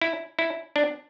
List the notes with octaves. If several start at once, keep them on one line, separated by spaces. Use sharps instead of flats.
E4
E4
D4